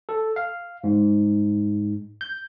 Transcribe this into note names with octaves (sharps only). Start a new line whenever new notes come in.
A4
F5
G#2
G6